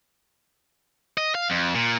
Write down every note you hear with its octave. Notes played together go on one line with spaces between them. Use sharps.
D#5
F5
F2
A#2